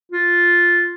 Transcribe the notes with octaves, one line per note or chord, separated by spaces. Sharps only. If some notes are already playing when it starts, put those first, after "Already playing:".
F4